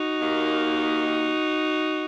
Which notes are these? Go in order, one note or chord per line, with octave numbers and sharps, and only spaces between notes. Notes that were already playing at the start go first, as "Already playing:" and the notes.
Already playing: D#4 F#4
D#2 D#3 A#3